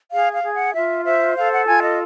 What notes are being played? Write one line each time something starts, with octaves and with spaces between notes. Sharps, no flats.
G#4 F5
F5
G#4
F#5
F4 E5
C5 E5
A4 F5
F#5
F4 G#5
D#5